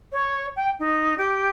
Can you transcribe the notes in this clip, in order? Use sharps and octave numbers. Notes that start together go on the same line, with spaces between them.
C#5
G5
D#4
G4